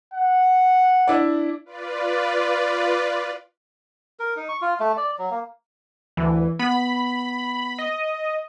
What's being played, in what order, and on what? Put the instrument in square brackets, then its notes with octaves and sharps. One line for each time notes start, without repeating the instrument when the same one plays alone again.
[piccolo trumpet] F#5
[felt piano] D4 E4 D5
[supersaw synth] F4 B4 D5
[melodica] A#4
D#4
C#6
F4
A3
D5
F#3
A#3
[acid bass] D2 [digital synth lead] E3
[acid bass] B3 [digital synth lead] B5
[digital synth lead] D#5